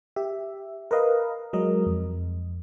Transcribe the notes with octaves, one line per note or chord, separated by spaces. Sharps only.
G4 E5
A#4 B4 D#5 F5
F#3 G#3 A#4 D#5
F2